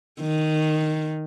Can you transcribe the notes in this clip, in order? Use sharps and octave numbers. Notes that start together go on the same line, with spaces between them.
D#3